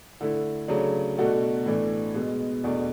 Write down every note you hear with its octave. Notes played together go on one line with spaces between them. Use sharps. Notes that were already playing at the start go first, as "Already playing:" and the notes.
D3 A3 E4
C#3 F#3 A3 D4
B2 A3 D4 F#4 A4
A2 E3 A3 D4
B2 G#3 B3
E2 B2 A3 D4